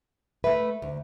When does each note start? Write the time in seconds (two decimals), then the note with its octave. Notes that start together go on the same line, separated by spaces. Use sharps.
0.44 A3 B4 E5
0.82 D2